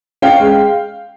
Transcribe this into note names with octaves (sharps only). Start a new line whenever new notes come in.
C#4 F5 G5
G#3